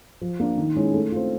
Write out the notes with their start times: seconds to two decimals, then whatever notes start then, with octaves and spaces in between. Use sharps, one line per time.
0.21 F3
0.40 A#3 D4
0.57 D#3
0.76 G#3 C#4 E4
0.94 A3
1.12 C4 F4